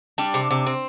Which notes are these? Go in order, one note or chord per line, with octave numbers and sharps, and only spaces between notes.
G3 D4
C3
C3
C4